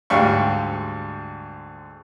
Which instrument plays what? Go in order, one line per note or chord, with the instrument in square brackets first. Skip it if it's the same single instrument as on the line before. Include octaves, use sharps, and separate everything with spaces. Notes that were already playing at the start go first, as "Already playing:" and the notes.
[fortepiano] D2 G#2 G3 F5 G5 C#6